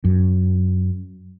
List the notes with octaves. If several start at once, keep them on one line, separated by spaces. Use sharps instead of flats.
F#2